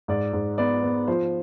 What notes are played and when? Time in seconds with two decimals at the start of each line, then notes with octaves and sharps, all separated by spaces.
0.08 G#2 D5
0.33 G#2
0.58 B3 D5
0.83 B3
1.08 F3 C5